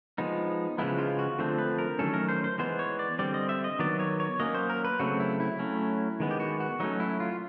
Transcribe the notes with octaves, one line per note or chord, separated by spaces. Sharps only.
F3 G#3 B3 D#4
C#3 F3 G#3 B3 E4
F4
F#4
D3 F3 A3 C4
B4
A#4
D#3 F#3 A3 C#4 A4
A#4
C5
C5
E3 G#3 B3 C5
C#5
D5
D3 G3 C4 D5
D#5
E5
D#5
D#3 F#3 B3 D5
C#5
C#5
F#3 A#3 C#4 D#5
C5
A#4
B4
C#3 F#3 A3 C4 F#4
E4
E4
F#3 A3 C#4
D#3 G#3 B3
G4
F#4
F#4
F#3 A3 C#4 D#4
E4
F4